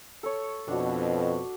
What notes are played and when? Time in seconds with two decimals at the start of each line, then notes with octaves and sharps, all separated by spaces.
0.23 A4 C#5
0.68 F2 B2 D4 F#4